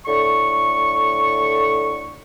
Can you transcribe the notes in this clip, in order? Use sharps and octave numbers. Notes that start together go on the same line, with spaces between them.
A2 D3 C#6